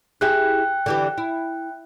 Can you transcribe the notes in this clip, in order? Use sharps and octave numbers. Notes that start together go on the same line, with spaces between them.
E4 G4 G#4 G5 F#6
D3 E3 G4
E4